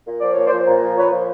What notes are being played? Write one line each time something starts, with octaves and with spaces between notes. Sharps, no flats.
A#2
F3 D5
A#2 C#5
C5 D5
F3
A#2
F3
A#2 B4 C#5
F3